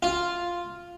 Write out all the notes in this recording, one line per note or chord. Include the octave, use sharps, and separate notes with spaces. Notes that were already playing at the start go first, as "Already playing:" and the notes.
F4